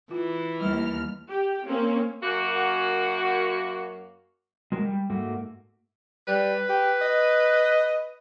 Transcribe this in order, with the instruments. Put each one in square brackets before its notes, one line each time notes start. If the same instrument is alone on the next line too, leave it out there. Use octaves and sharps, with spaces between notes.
[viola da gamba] E3 [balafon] F4
[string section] D#2 F6 [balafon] G3 A3 E4
[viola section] G4
A#3 C4 C#4
[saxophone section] F#2 A#3 F#4
[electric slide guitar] G#3 F#4 A#4
G3
G#2 A3 A#3 F#4
[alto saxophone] G3 [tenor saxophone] B4
[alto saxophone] G4
D#5